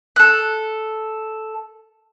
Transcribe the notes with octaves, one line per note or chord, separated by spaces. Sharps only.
A4 F#6